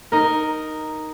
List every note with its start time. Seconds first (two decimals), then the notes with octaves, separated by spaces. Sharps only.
0.12 D#4 A#4